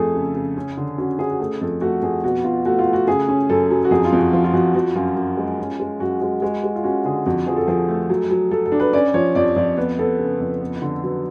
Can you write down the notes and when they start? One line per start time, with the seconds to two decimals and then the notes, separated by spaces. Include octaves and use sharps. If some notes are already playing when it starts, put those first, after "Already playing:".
Already playing: F2 A3 G#4 A4
0.15 C#3
0.35 C#3
0.57 C#4
0.77 D3
0.98 C#4 F#4
1.19 C#4 G#4
1.30 F#4
1.39 A3 G#4
1.61 F2 A4
1.81 A3 F#4
2.02 F2 G#4
2.24 B2 F#4
2.44 B2 F4
2.66 A3 F#4
2.79 F4
2.87 A3
2.93 F#4
3.07 C#3 G#4
3.29 C#4
3.49 F#2 A4
3.70 F#3
3.84 F#4
3.91 F2 G#4
4.05 F4
4.12 F2
4.19 F#4
4.33 F3 F4
4.44 F4
4.53 F2 F#4
4.75 F3 F#4
4.95 F#2 F4
5.16 F#2
5.37 G#3
5.59 C#4
5.80 G#3
6.00 F#2 F#4
6.21 G#3 F#4
6.42 G#3 F#4
6.63 G#3
6.76 F4
6.84 C#4 F#4
7.05 D3 G#4
7.26 F2 F#4
7.46 F3 G#4
7.56 A4
7.67 F3 G#4
7.88 A3
8.10 F#3
8.31 F#3
8.51 F#3 A4
8.66 A4
8.72 D4
8.80 B4
8.93 C#4 D5
9.14 F3 C#5
9.35 F2 D5
9.56 F2 D5
9.77 B3 B4
9.99 B3 A4
10.19 C#3
10.40 F2
10.61 B3
10.82 D3
11.03 F#3 B4